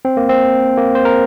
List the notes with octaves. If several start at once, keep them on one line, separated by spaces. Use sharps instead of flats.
C4
A#3
C4
A#3
C5
A#4